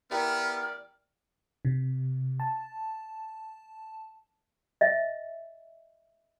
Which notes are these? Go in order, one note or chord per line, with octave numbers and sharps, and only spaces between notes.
B3 E4 G4 A#4 D5 F6
C3
A5
D#5 E5